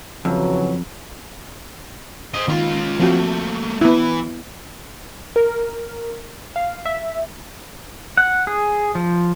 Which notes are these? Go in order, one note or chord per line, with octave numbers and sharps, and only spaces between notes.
F2 C#3 E3 F#3
C5 D#5
C#2 D#3 F4
F3 A3 A#3 C4 F#4
E3 B3 E4
A#4
F5
E5
F#5
G#4
F3